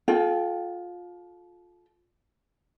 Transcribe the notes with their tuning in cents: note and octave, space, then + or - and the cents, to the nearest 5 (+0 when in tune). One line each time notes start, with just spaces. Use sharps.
F4 +20 A4 -35 G5 +0